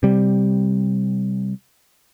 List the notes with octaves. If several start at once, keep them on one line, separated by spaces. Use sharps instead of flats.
C3 G3